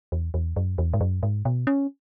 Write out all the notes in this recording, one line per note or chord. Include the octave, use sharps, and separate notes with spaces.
E2
E2
F#2
E2
G#2
F#2
G#2
B2
C#4